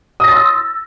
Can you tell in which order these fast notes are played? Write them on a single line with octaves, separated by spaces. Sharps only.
D#6 A#6 A6 C6 E6